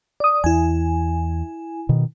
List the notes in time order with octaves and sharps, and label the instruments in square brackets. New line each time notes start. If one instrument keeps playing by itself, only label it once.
[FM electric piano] D5 D#6
[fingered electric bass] E2 [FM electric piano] E4 G#5
[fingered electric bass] B2 D#3